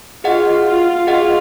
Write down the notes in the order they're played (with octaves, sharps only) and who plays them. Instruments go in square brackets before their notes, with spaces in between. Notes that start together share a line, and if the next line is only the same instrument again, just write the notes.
[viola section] F4 [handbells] G#4 D#5 F#5
[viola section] F4
[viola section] F4 [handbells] G#4 D#5 F#5